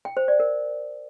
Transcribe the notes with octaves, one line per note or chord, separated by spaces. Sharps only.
G5
C5
D5
A#4